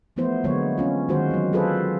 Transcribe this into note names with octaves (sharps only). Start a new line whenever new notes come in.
E3 F3 A3 B3 E4 C5
D3 F#3 G#3 A#3 B3 C#5
C4 C#4 F4
D#3 G#3 F#4 C5
E3 F#3
F#3 F4 G#4 A4 B4 C5